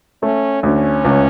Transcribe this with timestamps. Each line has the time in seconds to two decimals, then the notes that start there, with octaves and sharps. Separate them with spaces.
0.22 A3 C#4
0.63 D2 C#4
1.04 C#2